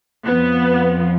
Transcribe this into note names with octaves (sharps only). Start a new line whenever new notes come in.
F2 F3 B3